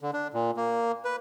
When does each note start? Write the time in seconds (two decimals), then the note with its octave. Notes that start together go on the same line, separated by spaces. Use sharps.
0.01 D3
0.13 D4
0.33 A#2
0.57 A#3
1.05 B4